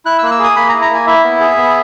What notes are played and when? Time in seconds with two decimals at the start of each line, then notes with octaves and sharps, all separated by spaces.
0.05 E4 F#6
0.19 E6
0.23 A#3 F#6
0.31 E6
0.39 G#4
0.44 D#6
0.56 A#3 B5
0.69 A#5
0.74 E4
0.81 A#5
0.90 A#3 G#5
1.07 E4 E5
1.24 B3
1.40 G#4
1.57 B3